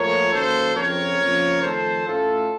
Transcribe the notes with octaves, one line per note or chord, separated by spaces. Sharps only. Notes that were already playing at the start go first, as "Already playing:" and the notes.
Already playing: A#2 F3 A3 A#4 C#5
F#2 D#3 F#3 A#3 A4 C5
F2 C#3 F3 C4 A#4 C#5
F2 C#3 F3 A#3
F2 D#3 A3 A4 C5
A2 A3 C#4 F4 A4